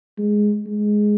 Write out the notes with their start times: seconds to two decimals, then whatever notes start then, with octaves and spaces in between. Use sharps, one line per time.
0.18 G#3
0.67 G#3